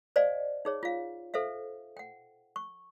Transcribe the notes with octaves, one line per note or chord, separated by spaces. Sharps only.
C5 D5 D#5 F5 G#5
D#4 G#4 C#5
F4 F5
A4 C5 E5 F5
F#5 G5
C#6